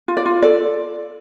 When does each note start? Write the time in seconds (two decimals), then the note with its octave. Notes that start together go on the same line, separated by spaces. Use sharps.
0.08 F4
0.17 D5
0.26 F4
0.42 A4 D5